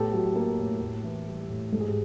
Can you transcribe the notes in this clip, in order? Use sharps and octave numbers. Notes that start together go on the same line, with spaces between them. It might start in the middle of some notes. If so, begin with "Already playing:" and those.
Already playing: A2 B3 G4 A4
F#3
A#3
A2
A2
E3
G3
A2
G#2 A4
G#4
G4